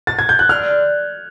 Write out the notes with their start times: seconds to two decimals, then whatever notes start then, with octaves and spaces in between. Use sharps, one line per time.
0.07 A6
0.19 G#6
0.29 G6
0.39 F#6
0.49 D3 F6